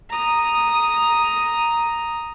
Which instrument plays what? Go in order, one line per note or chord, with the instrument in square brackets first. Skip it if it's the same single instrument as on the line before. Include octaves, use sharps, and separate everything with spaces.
[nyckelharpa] A#5 D#6